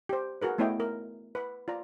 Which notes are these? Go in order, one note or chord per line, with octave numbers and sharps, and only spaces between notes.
G4 C5
F#4 G#4 A#4 B4
A3 B3 E4 C#5 D#5 G5
A#4
B4 B5
F4 D5 A#5